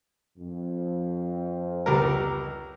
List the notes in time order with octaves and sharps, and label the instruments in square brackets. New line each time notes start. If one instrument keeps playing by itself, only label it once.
[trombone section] F2
[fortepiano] C#2 G3 A#4